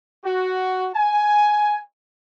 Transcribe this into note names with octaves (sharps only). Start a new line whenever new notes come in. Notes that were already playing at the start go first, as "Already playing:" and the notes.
F#4
G#5